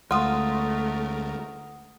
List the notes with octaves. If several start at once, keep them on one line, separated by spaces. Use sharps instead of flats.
D2 G#3 A3 F4 A#4 F#5 D#6